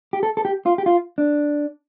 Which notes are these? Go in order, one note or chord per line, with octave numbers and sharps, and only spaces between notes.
G4
A4
A4
G4
F4
G4
F4
D4